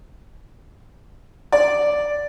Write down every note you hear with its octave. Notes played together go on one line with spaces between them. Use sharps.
D5